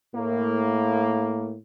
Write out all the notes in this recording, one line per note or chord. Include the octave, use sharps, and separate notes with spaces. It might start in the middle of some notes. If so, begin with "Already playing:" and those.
A2 A#3